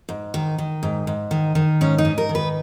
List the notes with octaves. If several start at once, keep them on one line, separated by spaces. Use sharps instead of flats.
G#2
D#3
D#3
G#2
G#2
D#3
D#3
G#2 C#4
D#4
G#2
A#4
D#3
B4